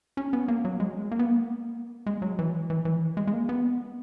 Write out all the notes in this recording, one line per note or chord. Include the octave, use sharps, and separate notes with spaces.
C#4
B3
A#3
F#3
G#3
A#3
B3
A#3
G#3
F#3
E3
E3
E3
G#3
G#3
A#3
B3